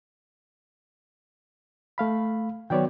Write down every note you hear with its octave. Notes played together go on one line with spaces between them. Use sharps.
A3 F5 B5
D#3 F#3 B3 C#5 D5 G5